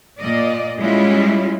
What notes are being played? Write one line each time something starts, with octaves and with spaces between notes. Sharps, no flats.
A#2 D5 D#5
G3 G#3 C#4 E4 F4